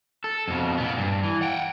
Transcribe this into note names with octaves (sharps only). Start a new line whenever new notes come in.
A4
F2 B2
A#2 B3
G2
E3
F#5 G5